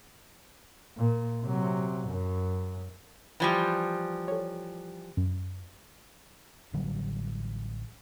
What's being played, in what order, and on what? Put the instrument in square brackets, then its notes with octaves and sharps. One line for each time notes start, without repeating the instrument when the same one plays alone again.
[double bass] A#2
C3 F#3
F#2
[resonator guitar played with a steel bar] E3 F3 G3
[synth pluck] A4 C#5
F#2
[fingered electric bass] A1 D3 F#3 G3